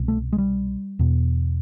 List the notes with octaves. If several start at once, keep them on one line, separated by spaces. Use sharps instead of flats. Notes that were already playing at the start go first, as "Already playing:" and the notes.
Already playing: C2 B2
A3
G#3
G3
E2 B2